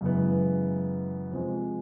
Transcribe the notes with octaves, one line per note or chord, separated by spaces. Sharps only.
F#2 C#3 E3 G#3 B3
F2 C3 F3 G#3